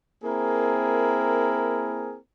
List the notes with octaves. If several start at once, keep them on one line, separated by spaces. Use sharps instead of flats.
A#3 C4 E4 G#4 A#4